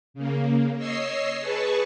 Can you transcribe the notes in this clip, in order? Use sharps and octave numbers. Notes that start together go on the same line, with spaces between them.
C#3 A#3
C#5 D#5 E6 C7
G#4 B4 A5 C#6